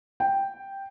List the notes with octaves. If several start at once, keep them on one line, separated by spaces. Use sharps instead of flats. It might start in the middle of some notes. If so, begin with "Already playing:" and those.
G5